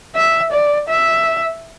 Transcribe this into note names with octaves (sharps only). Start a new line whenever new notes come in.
E5
D5
E5